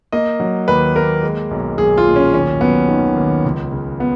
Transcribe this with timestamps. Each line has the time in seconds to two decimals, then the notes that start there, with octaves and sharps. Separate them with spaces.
0.13 A#3 D#5
0.40 F#3
0.68 D#2 B4
0.96 A#3 A#4
1.23 G#3
1.51 B1
1.78 B1 G#4
1.98 F4
2.07 A#2
2.16 C#4
2.33 D#2 C#4
2.61 F#3 B3
2.89 D#3
3.16 D#2
3.45 C#2
3.72 C#3
4.00 B3